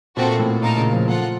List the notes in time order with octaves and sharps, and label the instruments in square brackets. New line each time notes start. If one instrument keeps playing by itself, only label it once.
[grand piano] A#2 [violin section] A3 C4 F#4 A4
[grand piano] A2
[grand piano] A#2 [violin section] D#4 A#4 F5 A5
[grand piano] C#3
F3
[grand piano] F3 [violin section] F4 A4 F#5